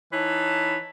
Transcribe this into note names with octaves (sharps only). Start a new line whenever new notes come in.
E3 D#4 B4 C#5 A5